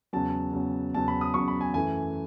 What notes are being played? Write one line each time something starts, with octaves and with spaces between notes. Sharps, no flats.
E2 C#3 F#3 A5
E2 C#3 F#3
E2 C#3 F#3 A5
B5
D#6
E2 C#3 F#3 C#6
B5
G#5
F#2 E3 A3 E4 G#5